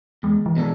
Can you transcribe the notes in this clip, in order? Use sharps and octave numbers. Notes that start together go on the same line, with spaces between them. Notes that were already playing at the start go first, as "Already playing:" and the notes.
E2 G#3
E3
B2 G#3 D4 A4